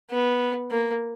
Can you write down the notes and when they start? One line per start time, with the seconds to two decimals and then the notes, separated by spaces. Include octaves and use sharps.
0.11 B3
0.71 A#3